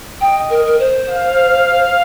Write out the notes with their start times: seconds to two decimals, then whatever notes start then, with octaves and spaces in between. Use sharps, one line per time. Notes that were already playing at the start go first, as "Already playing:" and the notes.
0.21 D#5 G5
0.50 A#4
0.65 A#4
0.80 C5
1.10 F5